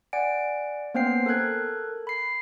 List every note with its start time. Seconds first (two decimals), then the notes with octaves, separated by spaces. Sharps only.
0.13 D5 F#5 G#5 D7
0.94 A#3 B3 C#4 C5 G5 C7
1.26 A4 A#4 F#6 G#6
2.07 B5 C7